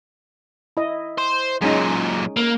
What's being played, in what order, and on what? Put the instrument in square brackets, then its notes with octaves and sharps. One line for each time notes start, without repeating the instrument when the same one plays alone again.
[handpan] E4 D#5
[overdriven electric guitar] C5
[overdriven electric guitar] F#2 A#2 [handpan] G#3 C#4 D#4
[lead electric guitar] A#3